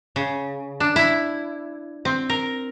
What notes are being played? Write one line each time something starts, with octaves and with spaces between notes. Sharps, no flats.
C#3
D4
E4
C4
A#4